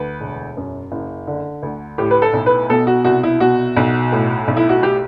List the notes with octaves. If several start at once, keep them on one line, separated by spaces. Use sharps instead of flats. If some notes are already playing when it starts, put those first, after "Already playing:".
Already playing: D2 B4
E1
F#2
F#1
D3
D2
A2 G4
B4
A4
B1
B4
B2 A4
F#4
C2 F#4
E4
B2 F#4
B1
A2
B1
E4
F#4
G4